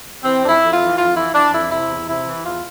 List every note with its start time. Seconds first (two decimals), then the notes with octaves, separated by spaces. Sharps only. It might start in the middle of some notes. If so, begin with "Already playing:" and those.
0.23 E3 C4
0.42 F2 D4
0.48 E4
0.61 F2
0.73 F4
0.79 E3
0.97 F2 F4
1.15 E3 E4
1.34 E3 D4
1.52 F2 E4
1.71 C3 E4
1.89 E2
2.07 C3 E4
2.26 E3
2.44 E2 F4